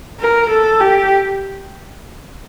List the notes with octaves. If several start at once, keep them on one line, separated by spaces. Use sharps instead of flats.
A#4
A4
G4